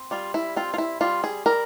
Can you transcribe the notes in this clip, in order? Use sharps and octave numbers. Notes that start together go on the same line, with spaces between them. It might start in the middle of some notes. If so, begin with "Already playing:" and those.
Already playing: C4
G3 F4
E4
C4 F4
F4
E4
G3 F4
G#4
G3 A#4